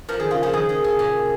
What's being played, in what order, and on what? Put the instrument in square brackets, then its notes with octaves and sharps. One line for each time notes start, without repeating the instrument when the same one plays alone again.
[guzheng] F2 F3 [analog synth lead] A#4
[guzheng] D#3 [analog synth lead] G#4
[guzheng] C#3 [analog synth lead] F4
[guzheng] F2 F3 [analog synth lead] G#4
[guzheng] D#3 [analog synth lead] G#4
[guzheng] C#3
C#3
A#2